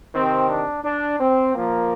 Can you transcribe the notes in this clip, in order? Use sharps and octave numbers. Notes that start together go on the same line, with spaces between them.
C3 D#3 C4
D4
D4
C4
A#2 F3 A#3